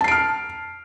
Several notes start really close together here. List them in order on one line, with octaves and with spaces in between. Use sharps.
A5 C7 D7 F6